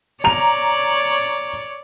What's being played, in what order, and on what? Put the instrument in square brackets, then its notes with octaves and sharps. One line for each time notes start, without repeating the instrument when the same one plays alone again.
[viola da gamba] C#5 D5 [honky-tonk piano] A#5 F7